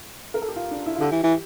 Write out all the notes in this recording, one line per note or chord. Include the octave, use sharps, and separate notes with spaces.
A#4
A4
G4
F4
D4
E4
F4
D3 G4
E3
E3